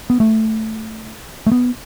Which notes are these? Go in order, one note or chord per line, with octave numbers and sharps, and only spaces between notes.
B3
A3
A3
B3